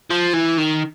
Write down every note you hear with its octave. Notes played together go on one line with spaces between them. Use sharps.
F3
E3
D#3